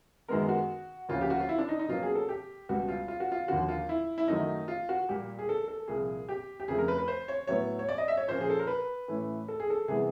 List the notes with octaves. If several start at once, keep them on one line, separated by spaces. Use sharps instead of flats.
F#2 D#3 G#3 B3 A#4
F#4
D2 C#3 F3 A#3 C#4 F4
G4
F#4
F4
E4
D4
D#4
D#4
B2 F#3 A#3 C#4 F4
G#4
A4
G4
C#2 B2 G3 F#4
F4
F4
F#4
F4
D#2 D3 F3 F#4
F4
E4
E4
F#2 D#3 F#3 A3 D#4
F4
F#4
A#2 G3 A#3 G4
G#4
A4
A4
C2 A#2 F3 A#3 G#4
G4
G4
F2 C#3 F3 A3 G#4
A#4
B4
B4
C5
C#5
A2 F#3 B3 C#5
C#5
D5
D#5
E5
C#5
A#2 F3 A#3 C#4 C5
G#4
A4
A#4
B4
A2 E3 A3 C#4
A4
G#4
A4
C3 E3 G3 B3 G#4